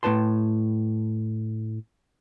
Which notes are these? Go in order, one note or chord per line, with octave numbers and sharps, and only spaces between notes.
A2 F4 B4 A5 C6